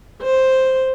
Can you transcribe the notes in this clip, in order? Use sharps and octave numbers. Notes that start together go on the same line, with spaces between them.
C5